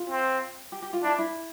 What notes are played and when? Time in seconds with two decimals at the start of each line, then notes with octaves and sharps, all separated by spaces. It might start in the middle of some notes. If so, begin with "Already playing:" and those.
Already playing: F4
0.10 C4
0.72 G4
0.82 G4
0.93 F4
1.03 D4 E4
1.19 E4